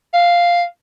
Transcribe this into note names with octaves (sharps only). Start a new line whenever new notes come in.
F5